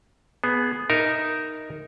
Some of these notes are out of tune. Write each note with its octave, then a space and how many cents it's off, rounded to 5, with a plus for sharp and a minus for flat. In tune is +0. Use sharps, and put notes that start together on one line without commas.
B3 +0 G#4 +15
D#4 +0 A#4 +0 E5 +0